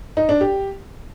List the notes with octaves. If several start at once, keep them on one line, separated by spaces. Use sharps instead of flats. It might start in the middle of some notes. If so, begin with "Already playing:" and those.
D#4
D4
G4